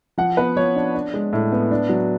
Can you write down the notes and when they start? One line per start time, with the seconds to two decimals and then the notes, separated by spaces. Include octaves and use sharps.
0.18 F3 F#5
0.37 B3 B4
0.56 F3 C#5
0.76 D4
0.95 D4
1.14 G#3
1.33 A2
1.52 B3
1.71 D4
1.89 F#3